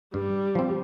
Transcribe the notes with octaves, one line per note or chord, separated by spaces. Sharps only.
G2 G3
F3 C4